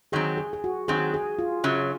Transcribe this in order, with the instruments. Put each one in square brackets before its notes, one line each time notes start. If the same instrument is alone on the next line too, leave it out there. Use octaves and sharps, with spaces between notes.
[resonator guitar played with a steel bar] D#3 F#3 C4 [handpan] G#4
[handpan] G#4
G#4
F#4
[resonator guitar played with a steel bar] D#3 F#3 C4 [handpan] G#4
[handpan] G#4
F4
[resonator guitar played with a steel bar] F#2 C#3 F#3